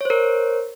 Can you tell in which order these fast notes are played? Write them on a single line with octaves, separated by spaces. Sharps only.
C#5 C5 A#4